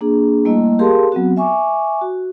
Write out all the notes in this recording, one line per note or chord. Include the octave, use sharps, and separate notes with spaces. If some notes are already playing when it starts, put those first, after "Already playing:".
A#3 D4 G#4
G3 A3 A#3 E4 D#5
G4 G#4 A#4 F5 A5 C6
F#3 B3 C4 F#4
E5 G#5 C#6 D6
F#4